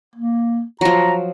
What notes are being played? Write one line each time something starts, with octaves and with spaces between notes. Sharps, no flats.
A#3
F3 F#3 A#5